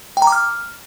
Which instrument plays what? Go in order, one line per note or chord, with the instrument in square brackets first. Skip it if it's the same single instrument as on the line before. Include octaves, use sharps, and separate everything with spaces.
[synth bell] G5
A#5
D6
F6